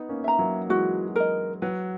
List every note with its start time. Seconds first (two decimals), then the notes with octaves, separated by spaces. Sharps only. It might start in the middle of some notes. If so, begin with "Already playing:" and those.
Already playing: B3 D#4
0.09 A#3 C#4
0.24 E5 A#5
0.39 F#3 A#3
0.69 E3 G#3 F#4
1.16 A#4 D#5
1.62 F#3 B4